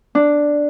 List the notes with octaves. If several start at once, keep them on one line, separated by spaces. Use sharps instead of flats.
D4